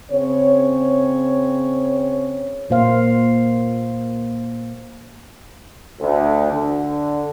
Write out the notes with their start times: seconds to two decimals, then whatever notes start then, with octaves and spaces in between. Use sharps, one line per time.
0.11 C#3 C4 C#5
2.70 A#2 A#3 C5 F5
6.01 D2
6.52 D3